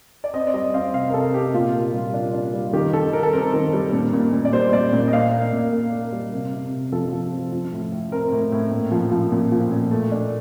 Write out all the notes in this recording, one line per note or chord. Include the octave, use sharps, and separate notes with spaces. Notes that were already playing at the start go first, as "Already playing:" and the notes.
D5
C4 D#5
D5
G3 D#5
C4 F5
C3 F5
A#4
C3 A4
C3 G4
A#2 F4
A#3
G3
D4
D4
G3
D#3 G4
D#3 A4
G3 A#4
A4
C4 A#4
D#3
G3
A#2
A#2
A#2
D5
G3 C5
A#2 D5
A#2
D#5
D4 F5
A#3
A#2
A#3
A#3
G3
C3
C3
C3
F3 A4
F3
C4
F3
A2
A2
C4 A#4
A2
A2
A#2
F3
F3
A#2
F3
A#2
A3
D4